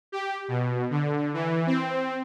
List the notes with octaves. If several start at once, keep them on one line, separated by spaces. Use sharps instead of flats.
G4
B2
D3
E3
C4